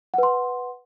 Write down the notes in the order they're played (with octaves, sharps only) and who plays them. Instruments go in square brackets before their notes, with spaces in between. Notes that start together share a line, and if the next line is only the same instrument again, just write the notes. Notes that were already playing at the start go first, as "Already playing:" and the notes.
[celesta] F#5
B4
C6